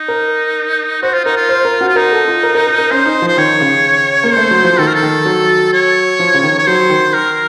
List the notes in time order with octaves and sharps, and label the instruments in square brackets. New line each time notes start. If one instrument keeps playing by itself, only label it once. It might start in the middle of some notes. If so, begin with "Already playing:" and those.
Already playing: [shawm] D#4
[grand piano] A#4
[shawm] F#4 [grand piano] C5
[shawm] F4
[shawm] D#4 [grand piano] A#4
[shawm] F4
[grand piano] C5
A#4
F#4
[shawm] F4
[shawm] D#4 [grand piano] A#4
[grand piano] A4
F4
A#4
A#4
A#4
A#4
[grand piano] C#4 [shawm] C5
[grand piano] D#4
F3
[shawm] C5
[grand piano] D#3 [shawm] C#5
[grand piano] C#3
A#3
[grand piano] A3 [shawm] C5
[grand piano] F#3
F3
[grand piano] D#3 [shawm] A4
[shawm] A#4
A4
[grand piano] D#3
F#3
[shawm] C#5
[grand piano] F3
C#3
D#3
[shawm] C#5
[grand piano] F#3 [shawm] C5
[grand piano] D#3
[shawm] A#4